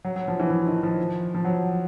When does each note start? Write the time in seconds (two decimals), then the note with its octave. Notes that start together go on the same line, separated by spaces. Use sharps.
0.05 F#3
0.16 F#3
0.28 F3
0.40 E3
0.51 F3
0.67 D#3
0.83 F3
1.35 F3
1.45 F#3